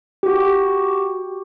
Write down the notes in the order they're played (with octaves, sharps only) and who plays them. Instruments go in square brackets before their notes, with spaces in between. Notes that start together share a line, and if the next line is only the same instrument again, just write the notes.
[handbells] F#4 G4